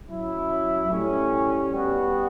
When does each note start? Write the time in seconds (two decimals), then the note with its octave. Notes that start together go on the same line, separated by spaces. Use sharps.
0.08 F#3 C#4 E4
0.89 A2 G3 C#4
1.71 G3 B3 F#4